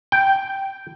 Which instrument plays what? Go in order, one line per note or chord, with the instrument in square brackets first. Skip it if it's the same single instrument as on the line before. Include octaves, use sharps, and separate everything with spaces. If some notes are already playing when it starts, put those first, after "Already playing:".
[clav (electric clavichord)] G5